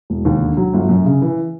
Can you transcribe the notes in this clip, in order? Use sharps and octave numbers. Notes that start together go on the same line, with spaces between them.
E1
D#2
D3
F#3
G1
F#2
C#3
E3